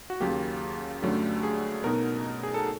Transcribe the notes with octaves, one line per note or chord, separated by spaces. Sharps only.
F#4
D#2 C#3 F#3 A#3 G4
G2 D3 F#3 A3 C#4
G#4
B2 F#3 B3 D#4 A#4
G#4
A4